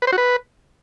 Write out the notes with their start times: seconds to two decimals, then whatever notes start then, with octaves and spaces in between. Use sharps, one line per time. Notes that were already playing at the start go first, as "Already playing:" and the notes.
0.02 B4
0.07 C5
0.13 F#4
0.18 B4